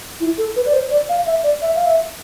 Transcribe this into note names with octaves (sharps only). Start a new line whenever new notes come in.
E4
A4
B4
D5
C5
D5
F5
E5
D5
E5
F5
E5